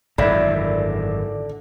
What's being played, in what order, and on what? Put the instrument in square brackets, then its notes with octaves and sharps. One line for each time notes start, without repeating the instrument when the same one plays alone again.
[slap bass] G#1 F#2 [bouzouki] D3 [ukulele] E4 E5 B5 [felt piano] D5